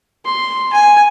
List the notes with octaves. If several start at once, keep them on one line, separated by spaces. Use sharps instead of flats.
C6
G#5